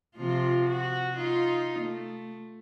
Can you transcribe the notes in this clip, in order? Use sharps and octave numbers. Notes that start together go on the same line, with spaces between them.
C3 F3 F4
F#4
D#4 F4
A3